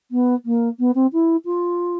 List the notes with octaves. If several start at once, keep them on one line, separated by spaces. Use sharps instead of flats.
B3
A#3
B3
C4
E4
F4